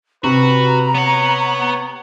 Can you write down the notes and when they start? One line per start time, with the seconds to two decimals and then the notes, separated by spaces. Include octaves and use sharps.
0.24 C3 F#4 B4 A#5
0.95 B3 C#5 F#5